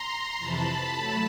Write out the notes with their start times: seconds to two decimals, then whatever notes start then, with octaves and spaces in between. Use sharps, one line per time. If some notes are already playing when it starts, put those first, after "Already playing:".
Already playing: A#5 C6
0.38 F2 C3 E3 A5 B5
0.96 F#3 A3